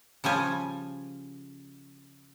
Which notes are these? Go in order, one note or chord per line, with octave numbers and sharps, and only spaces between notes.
C#3 F3 G3 G#5